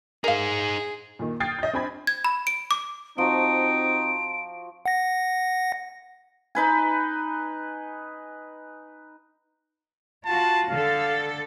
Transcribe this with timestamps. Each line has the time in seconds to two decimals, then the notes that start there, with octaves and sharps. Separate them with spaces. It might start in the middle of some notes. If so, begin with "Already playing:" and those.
0.24 D#4 G#4 A#4 C5 F5
1.19 A#2 D#3
1.40 G5 D#6 F6 G#6 A6 C7
1.59 D#5 G6
1.73 C4 D4 G5 G#5 B5 G#6
2.07 G#6
2.25 B5
2.47 D7
2.71 D6
3.18 F3 C4 D#4 F#4 D7
4.86 F#5 A#6
6.55 D#4 B4 G#5
10.26 F4 F#4 A5
10.69 D3 A4 F5